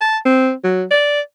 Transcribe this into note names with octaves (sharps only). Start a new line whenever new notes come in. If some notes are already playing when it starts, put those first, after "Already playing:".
A5
C4
F#3
D5